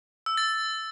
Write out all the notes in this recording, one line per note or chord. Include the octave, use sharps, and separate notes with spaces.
E6
A6